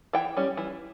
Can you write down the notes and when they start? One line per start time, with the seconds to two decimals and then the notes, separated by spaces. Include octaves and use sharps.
0.13 E3 G5
0.36 G3 C#4
0.57 E3